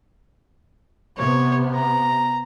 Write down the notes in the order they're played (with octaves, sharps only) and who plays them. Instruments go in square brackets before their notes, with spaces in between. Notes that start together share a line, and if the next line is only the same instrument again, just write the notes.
[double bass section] C3 B3 [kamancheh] C#5
[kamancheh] A#5